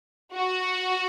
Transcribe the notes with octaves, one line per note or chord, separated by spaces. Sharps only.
F#4